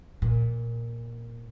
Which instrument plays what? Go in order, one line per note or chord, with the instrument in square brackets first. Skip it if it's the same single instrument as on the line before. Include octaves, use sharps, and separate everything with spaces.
[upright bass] A#2